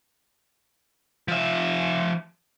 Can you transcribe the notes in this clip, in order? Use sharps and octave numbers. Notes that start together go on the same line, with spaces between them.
F3 E5